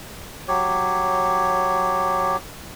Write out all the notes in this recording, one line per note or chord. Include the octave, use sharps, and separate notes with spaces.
F#3 G4 C#5